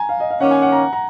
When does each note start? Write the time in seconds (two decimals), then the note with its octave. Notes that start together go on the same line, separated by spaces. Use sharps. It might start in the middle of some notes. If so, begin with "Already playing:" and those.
Already playing: G#5 A#5
0.09 F5
0.20 D#5
0.30 F5
0.40 D#3 A#3 C#4 F#5
0.51 G#5
0.62 F#5
0.72 A#5
0.93 A#5